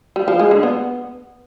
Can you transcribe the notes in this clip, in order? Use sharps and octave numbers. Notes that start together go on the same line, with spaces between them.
G3
F3
G#3
D3
B3